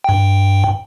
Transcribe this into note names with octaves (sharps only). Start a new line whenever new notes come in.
G2 G5